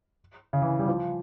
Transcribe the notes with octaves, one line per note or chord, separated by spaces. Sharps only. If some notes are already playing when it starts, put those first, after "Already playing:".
C#3
E3
G3
F3